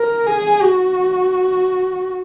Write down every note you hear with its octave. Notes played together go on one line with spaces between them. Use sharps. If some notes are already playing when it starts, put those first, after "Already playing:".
Already playing: A#4
G#4
F#4